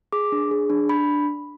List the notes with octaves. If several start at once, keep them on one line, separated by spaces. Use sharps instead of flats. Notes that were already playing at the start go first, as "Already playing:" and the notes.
G#4 D6
D4
G#4
D4
D4 B5